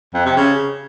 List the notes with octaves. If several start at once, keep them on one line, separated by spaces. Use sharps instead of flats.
F2
C3
C#3